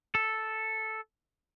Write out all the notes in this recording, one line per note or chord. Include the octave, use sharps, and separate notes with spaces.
A4